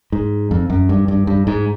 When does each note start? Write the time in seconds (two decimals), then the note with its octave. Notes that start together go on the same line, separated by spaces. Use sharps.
0.12 G#2
0.51 F2
0.70 F#2
0.89 G2
1.08 G2
1.27 G2
1.47 G#2